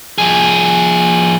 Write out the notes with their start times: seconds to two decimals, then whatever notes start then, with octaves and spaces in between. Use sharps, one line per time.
0.18 F3 G#4